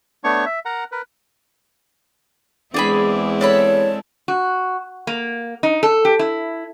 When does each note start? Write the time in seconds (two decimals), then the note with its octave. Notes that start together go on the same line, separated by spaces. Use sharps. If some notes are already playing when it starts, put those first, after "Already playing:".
0.24 A3 B3 D4 C#5 C#6
0.46 E5
0.65 A#4 F#5 A#5
0.92 A#4 B4
2.74 E2 G#3 C4 D4 E4 G#4 B5
3.41 D4 A4 C#5 B5
4.28 F#4
5.07 A#3
5.63 D#4
5.83 A4
6.05 G4
6.19 E4